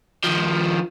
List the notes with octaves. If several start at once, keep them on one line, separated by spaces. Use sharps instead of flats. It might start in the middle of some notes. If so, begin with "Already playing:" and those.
D#3 F3